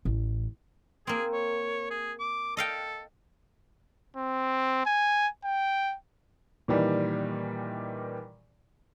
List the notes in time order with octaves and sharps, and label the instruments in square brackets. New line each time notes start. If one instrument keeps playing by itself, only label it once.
[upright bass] A1
[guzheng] A#3 C4 [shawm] G#4
[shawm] C#5
G#4
D6
[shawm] A4 [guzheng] D#5 F5 G5
[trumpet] C4
G#5
G5
[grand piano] A#2 D#3 E3 G3